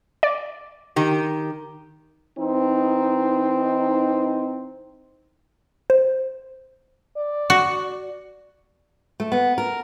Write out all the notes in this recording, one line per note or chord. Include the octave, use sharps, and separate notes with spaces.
D5
D#3 G4
E3 C4 D#4
C5
D5
F#4
A3
B3
A#4